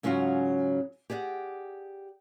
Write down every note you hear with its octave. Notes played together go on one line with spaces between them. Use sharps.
G#2 C#3 F#3 C#4 F4 F#4
G4 G#4 D5 F#5